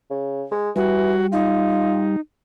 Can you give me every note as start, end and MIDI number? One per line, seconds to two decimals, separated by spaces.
0.11 0.45 49
0.51 0.70 56
0.76 1.13 52
0.76 2.16 55
0.76 1.26 66
1.32 2.20 63
1.32 2.03 65